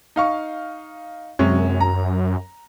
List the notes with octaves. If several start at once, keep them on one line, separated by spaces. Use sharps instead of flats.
D#4 F5 C#6
F#2 C3 G#3 C#4
A#5